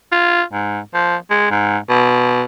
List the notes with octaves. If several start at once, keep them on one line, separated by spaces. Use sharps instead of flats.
F4
G#2
F3
G#3
G#2
B2